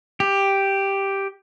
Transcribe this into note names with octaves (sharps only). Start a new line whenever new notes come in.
G4